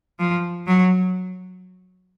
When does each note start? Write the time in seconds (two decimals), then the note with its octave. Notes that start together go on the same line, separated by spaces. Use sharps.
0.19 F3
0.67 F#3